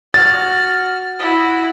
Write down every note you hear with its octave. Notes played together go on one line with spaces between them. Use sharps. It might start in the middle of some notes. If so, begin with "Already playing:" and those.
F#4 F6 A6
E4 F#4